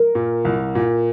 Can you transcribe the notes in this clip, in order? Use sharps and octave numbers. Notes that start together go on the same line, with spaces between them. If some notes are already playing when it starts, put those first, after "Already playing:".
Already playing: A#4
A#2
C2
A#2